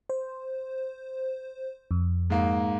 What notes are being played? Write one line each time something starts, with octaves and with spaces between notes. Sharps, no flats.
C5
F2
G#2 A#3